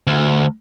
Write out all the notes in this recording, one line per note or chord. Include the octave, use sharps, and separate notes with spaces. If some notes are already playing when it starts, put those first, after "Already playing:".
D2